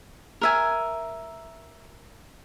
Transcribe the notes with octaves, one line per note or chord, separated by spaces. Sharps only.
A#4 E5 G#5